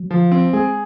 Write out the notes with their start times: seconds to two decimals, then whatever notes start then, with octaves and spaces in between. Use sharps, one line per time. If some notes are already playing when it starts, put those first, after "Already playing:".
Already playing: F#3
0.11 F3
0.32 C4
0.53 G#3 G#4